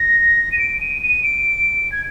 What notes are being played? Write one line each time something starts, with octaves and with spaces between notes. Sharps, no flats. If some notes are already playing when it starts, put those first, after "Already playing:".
Already playing: A#6
D#7
D7
D#7
D#7
D7
G#6